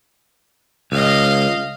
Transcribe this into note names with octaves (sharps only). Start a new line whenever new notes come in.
C#2 D#5 F5